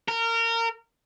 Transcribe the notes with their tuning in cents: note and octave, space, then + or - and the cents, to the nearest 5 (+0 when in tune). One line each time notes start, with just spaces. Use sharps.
A#4 -25